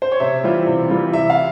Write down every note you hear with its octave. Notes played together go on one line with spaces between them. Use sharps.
C5
C#5
C3 E5
E3 G3 C4 F4
C3
E3 G3 C4 F4
C3 E5
F5